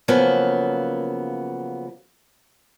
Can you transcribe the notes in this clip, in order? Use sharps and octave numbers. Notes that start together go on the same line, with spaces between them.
C#3 F3 F#3 A#3 B3